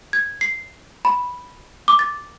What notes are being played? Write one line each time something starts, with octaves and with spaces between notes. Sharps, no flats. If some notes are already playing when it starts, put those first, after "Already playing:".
G#6
C7
B5
D6
A6